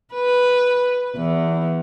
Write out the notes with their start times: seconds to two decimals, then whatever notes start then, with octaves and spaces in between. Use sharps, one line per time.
0.14 B4
1.17 E2